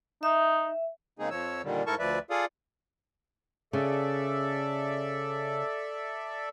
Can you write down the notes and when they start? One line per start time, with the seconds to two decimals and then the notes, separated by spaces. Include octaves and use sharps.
0.23 D#4 E5
1.19 C#3 G#3 A#3 C4 D#4 G#4
1.30 F2 F3 C#5 E6
1.64 A#2 D3 D#3 G3
1.87 G#2 E4 A4 A#4 A5 C#6
1.99 D2 F3 B4 D5 E5
2.30 F4 G#4 A4 D5 F5 D#6
3.73 C#3 A4 D5 E5